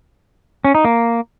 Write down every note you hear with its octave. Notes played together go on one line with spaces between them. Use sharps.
C#4
D#4
A#3